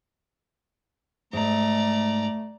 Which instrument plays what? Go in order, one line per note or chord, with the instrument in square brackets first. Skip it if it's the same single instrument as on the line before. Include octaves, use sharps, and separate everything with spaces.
[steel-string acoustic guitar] G#2 [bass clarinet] A3 [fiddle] D5 A#5